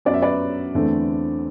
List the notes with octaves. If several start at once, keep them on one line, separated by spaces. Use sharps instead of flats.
F#2 F#3 B3 D5
E5
B4 D5
E2 D3 A3 C4